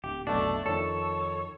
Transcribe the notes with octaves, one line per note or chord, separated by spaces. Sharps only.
D1 G4
F1 B1 B2 A3 D4
F2 D#3 A4 C#5